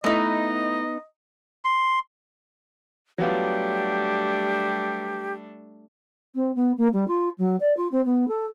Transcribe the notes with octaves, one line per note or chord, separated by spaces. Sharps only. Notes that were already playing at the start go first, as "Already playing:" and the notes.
A3 B3 D#4 E4 D#5
C6
F#3 G3 A3 B3 D4 F4 G4
C4
B3
A#3
G3
F4
F#3
D5
F4
C4
B3
A4